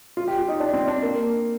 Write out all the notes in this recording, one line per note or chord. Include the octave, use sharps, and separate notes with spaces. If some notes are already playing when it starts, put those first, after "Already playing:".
F4
G4
F4
D#4
D4
C4
D4
A#3